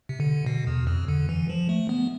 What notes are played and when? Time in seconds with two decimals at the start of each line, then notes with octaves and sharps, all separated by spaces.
0.09 C3
0.20 D3
0.46 B2
0.67 E2
0.87 F2
1.08 D3
1.29 E3
1.50 F3
1.69 A3
1.89 B3